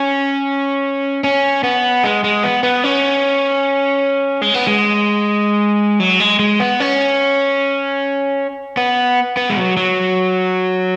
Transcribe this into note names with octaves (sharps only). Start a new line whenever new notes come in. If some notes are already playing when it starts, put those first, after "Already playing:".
Already playing: C#4
C#4
B3
G#3
G#3
B3
B3
C#4
G#3
B3
G#3
F#3
G#3
G#3
B3
C#4
B3
B3
G#3
F#3
F#3